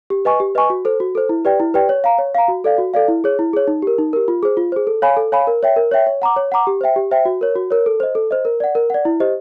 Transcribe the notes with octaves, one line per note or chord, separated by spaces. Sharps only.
G4
B4 D#5 G#5 C#6
G4
B4 D#5 G#5 C#6
F#4
A4 C5
F#4
A4 C5
E4
G4 B4 D5 G5
E4
G4 B4 D5 G5
C#5
F5 A#5
C#5
F5 A#5
F#4
A4 D5 F5
F#4
A4 D5 F5
E4
G#4 C#5
E4
G#4 C#5
D#4
G4 A#4
D#4
G4 A#4
F4
G#4 C5
F4
G#4 C5
A4
C#5 F5 G#5 B5
A4
C#5 F5 G#5 B5
A#4
C#5 E5 G5
A#4
C#5 E5 G5
C#5
F#5 A#5 D6
C#5
F#5 A#5 D6
G4
C5 E5 G5
G4
C5 E5 G5
F#4
A#4 C#5
F#4
A#4 C#5
A4
C5 D#5
A4
C5 D#5
A#4
D5 F#5
A#4
D5 F#5
E4
G4 C5 D#5